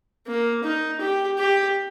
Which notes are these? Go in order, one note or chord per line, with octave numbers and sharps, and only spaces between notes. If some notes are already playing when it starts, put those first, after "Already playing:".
A#3
D#4
G4
G4